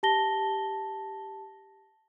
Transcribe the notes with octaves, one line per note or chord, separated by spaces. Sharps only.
G4 A5 A#6 G7